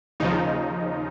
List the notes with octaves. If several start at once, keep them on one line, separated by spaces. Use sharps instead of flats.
D#2 C#3 F3 D#4